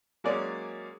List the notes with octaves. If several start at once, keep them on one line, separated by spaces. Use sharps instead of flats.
F#3 G#3 A#3 C#4 C#5 D5